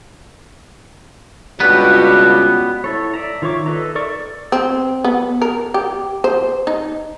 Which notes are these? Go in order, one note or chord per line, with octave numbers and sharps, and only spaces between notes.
C#2 G2 B2 B3 F#4 G4 B4
E4 A4 C#5
D5 E5 A#5
D#3 F4 C#5 C#6 D6
D#4 A4 B4 E5 A#5
A4 A#4 D5 C#6
D5
C4
B3
A#4
G4
C5
D#4